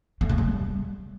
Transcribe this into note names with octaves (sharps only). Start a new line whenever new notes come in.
A3
C#3
G3